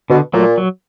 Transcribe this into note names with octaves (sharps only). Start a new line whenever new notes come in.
B2 D3
A#2 F#3 A3
F#3